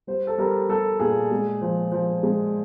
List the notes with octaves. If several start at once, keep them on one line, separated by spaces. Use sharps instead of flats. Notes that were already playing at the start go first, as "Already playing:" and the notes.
G3 C5
A4
G3 A#4
G3 A4
A#2 G#4
G#3
F3
F3
G#3